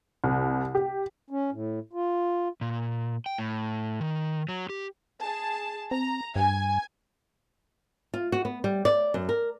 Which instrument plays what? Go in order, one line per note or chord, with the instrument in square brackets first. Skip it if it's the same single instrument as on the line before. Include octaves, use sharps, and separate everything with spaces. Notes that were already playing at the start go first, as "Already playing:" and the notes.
[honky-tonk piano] C2
G4
[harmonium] C#4
A2
F4
[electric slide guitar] A#2
G5
A2
D#3
F#3
G4
[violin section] G#4 A5
[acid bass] C4 [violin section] A#5
[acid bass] G2 [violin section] G#5
[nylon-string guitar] F4
F#4
B3
G3
D5
F#2
A#4